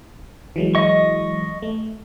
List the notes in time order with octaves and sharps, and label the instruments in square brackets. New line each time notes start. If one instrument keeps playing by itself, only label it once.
[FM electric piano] E3 F#3 G#3
[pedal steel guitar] D#5 C#6
[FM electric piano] A3